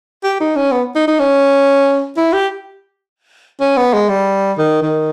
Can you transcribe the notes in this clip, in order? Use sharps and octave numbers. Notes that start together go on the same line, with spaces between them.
G4
D#4
C#4
B3
D#4
D#4
C#4
E4
G4
C#4
B3
G#3
G3
D#3
D#3